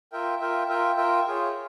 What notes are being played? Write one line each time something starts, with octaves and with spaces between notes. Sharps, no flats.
F4 A#4 E5 G5
F4 A#4 E5 G5
F4 A#4 E5 G5
F4 A#4 E5 G5
F4 G#4 C#5